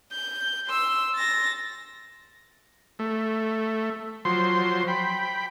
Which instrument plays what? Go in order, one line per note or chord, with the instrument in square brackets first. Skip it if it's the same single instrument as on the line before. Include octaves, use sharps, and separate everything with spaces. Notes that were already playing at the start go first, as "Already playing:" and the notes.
[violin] G6
C6 E6
A6 A#6
[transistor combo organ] A3
F3 F#3 C5 C6
G5 B5